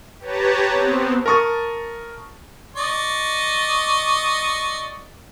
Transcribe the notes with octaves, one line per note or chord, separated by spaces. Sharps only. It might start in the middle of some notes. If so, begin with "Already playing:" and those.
G4 B4 C#5 A5 A#5
B3 C4
A#4 A5 C#6 D#6 A6
D5 D#5 C#6